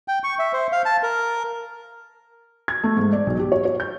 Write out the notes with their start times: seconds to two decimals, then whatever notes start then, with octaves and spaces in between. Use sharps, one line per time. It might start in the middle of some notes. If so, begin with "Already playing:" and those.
0.08 G5
0.24 C#6
0.39 E5
0.53 C5
0.72 F5
0.85 A5
1.03 A#4
2.68 G#6
2.84 A3
2.97 G#2
3.13 D5
3.27 B1
3.39 G4
3.52 C#5
3.65 C#5
3.80 G6